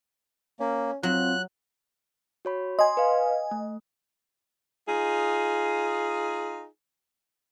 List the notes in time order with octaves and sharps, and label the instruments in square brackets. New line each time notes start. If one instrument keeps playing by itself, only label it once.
[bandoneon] A#3 [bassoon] C#4
[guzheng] F#3 [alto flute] C4 [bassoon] F4 [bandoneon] F#6
[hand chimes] F#4 C#5 B5
[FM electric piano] D#5 G#5 [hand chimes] C6
[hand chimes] B4 F5
A3
[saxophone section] D#4 F4 G#4